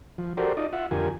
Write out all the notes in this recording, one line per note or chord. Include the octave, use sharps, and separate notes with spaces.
F3
F#4 G4 A4 A#4 C5 D5
D#4 F4 D5 D#5
F4 E5 F#5
F2 D3 F4 G4 A#4 G#5